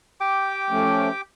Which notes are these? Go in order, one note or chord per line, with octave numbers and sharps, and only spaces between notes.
G4 G5 D6
F3 A3 C#4